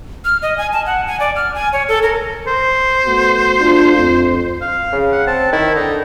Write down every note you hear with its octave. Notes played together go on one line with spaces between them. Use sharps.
F6
D#5
G#5
A5
F#5
G#5
D5
F6
G#5
C#5
A4
A#4
C5
A3 B3 F#4
A3 D4 F4
F2
F5
C#3
F#5
C4 A5
D#3 E4
D3 D#4